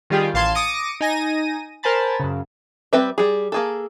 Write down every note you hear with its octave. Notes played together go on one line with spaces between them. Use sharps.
D#3 G3 F4 G4 G#4
A1 F5 A5 C6 G#6 E7
D6 D#6 A#6 C#7 D#7
D#4 G#5 A#6 D#7
A#4 C5 G#5 A5 B5 A6
F#2 C#3
G3 C4 B4 E5
G3 G#4
A#3 G#4 A4